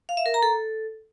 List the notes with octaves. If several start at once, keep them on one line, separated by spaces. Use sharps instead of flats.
F5
E5
A#4
A#5
A4